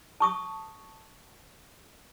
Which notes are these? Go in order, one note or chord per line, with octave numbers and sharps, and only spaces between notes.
A5 C#6 D#6